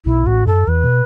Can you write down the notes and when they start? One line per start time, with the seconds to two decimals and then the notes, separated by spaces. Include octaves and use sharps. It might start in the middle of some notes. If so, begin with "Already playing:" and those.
0.05 B1 B2 E4
0.26 A1 A2 F#4
0.46 F#2 A4
0.67 E2 E3 B4
0.84 B2